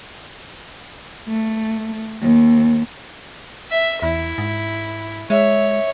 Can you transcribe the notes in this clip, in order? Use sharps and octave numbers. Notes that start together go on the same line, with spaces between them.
A3
D#2
E5
E2 E4
G#2
G#3 C#5 E5